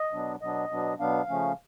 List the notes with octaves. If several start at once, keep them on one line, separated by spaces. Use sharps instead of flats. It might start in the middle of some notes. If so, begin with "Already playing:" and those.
Already playing: D#5
B2 F#3 B3 D4
B2 F#3 B3 D4 D#5
B2 F#3 B3 D4
B2 F#3 B3 D4 F5
C#3 F3 A3 C#4